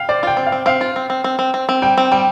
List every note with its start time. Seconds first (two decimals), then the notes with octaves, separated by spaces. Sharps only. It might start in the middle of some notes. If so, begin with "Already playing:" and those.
Already playing: F5 G5
0.09 C5 D5
0.23 F4 G5
0.37 C4
0.47 F5
0.52 C4
0.66 C4 F5
0.81 F4
0.96 C4
1.10 C4
1.24 C4
1.39 C4
1.54 C4
1.69 C4
1.82 G3 G5
1.98 C4
2.12 G3 G5